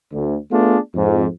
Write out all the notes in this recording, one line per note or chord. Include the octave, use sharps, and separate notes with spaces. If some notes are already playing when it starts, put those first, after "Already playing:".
D2
A3 B3 D4 F4 G#4
F2 G#2